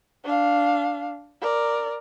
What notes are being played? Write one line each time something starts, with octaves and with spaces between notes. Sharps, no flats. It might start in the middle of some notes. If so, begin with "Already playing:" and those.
D4 F5
A#4 D5